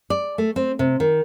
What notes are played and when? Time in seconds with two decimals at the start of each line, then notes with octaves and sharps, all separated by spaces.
0.10 D5
0.38 A3
0.56 C4
0.79 C3
1.00 D#3